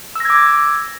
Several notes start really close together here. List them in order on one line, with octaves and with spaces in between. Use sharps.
E6 A#6 G#6 D6